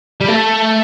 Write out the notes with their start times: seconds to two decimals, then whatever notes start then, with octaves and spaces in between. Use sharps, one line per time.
0.21 G3
0.28 A3